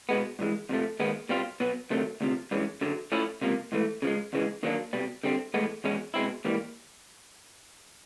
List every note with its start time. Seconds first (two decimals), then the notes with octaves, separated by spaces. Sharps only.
0.09 B2 G#3 B3
0.39 G2 E3 G#3
0.69 F2 C3 F3 A3
1.00 D#2 D#3 G#3 B3
1.29 B2 G3 C4 F4
1.60 B2 F#3 B3
1.90 D2 C3 D#3 F#3 A3
2.21 D2 C3 F3
2.51 G2 E3 G#3 C#4
2.81 F#2 D3 F#3
3.12 A2 F3 A3 C#4 E4
3.41 C#2 C3 F3 A#3
3.72 G#2 E3 A3
4.02 C#3 F3 G#3
4.33 E2 C#3 E3 G#3
4.63 D#2 D#3 F#3 A#3 D4
4.93 C2 B2 G3
5.24 D3 G3 C4
5.54 A2 E3 G#3 B3
5.84 E2 B2 G#3 C#4
6.14 B2 G#3 C4 E4
6.45 G#2 E3 G3 A#3